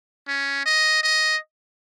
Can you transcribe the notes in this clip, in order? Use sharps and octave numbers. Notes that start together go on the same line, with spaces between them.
C#4
D#5
D#5